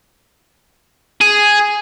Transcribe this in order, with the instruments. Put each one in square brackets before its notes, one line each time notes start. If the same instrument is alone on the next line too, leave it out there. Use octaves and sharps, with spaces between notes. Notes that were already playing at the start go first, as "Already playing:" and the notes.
[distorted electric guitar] G#4